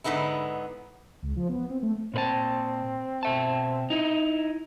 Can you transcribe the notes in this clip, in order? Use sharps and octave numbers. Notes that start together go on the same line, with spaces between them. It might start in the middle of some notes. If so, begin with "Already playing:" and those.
G#2 D3 B3 D#4 E4
C#2
F3
B3
C4
A3
A#2 C4 B4 A5
B2 E5 A5
D#4 E4